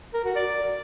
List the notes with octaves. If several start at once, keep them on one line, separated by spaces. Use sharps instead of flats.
A#4
F#4
D5